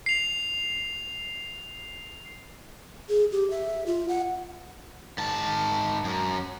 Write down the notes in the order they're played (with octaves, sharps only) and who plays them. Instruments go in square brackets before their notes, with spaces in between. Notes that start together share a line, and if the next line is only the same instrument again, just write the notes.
[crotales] C7 F7
[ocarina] G#4
G4
E5
F4
F#5
[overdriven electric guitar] G#2 A5
F#2